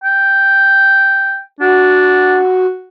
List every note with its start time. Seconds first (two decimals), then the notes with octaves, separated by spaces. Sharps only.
0.04 G5
1.60 D4 F#4